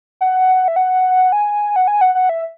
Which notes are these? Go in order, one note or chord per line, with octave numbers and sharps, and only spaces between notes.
F#5
E5
F#5
G#5
F#5
G#5
F#5
F#5
E5